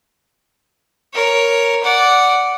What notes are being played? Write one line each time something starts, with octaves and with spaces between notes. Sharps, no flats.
A#4 C#5
D5 F#5